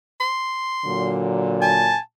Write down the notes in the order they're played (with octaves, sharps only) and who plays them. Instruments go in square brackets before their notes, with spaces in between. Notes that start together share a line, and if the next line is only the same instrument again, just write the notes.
[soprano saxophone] C6
[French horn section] A#2 D3 F#3
[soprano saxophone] G#5 [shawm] A5